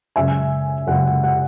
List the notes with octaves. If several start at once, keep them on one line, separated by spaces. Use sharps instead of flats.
F#2 C#3 G#3 E5 G#5
F#2 C#3 G#3 F#5
F#5
F#5